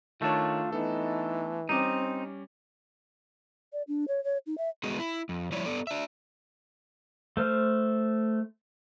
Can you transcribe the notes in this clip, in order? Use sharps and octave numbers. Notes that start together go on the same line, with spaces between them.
D#3 A3 D4 F4 C#5
E3 B3 D#4 A4
G3 C4 C#4 D#4 D6
D5
D4
C#5
C#5
D#4
E5
D3 G#3 B3 F#4 G#4
E4
F2
F3 G3 E4 C#5 D5
B3 A4 D5
D4 E5
A3 C5 F6